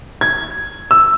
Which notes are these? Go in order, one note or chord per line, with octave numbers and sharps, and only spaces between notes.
G#6
E6